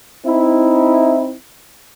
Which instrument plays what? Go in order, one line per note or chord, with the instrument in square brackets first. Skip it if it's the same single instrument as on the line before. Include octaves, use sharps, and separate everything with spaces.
[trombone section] C4 D#4 E4